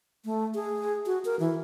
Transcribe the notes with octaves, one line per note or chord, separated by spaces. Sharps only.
A3
G#4
F#4
A#4
E3